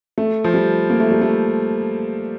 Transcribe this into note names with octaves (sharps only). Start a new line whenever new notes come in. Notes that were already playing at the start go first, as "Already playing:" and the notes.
A3
F3
G3
A#3
A3
G3
A3